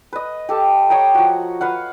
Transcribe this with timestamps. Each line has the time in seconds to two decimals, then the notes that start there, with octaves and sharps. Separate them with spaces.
0.13 B4 D#5
0.49 G4 A4 A5
0.90 C#5 D#5 G5 A#5
1.15 F3 F#4
1.61 B4 F5 F#5